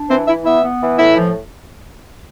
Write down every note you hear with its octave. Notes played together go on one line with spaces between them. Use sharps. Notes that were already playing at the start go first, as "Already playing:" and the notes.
Already playing: D4
E3 C4 C5
E3 E4 E5
B3 E4 E5
B3
E3
A2 E4 E5
F3